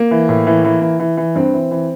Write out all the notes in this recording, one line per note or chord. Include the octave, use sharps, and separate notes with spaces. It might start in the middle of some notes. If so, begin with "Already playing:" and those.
Already playing: A#3
E3
A2
E3
E3
E3
E3
E3
G2 C4
E3
E3